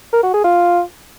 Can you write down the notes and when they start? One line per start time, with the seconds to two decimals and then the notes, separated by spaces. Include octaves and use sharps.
0.13 A#4
0.23 F#4
0.34 G#4
0.44 F4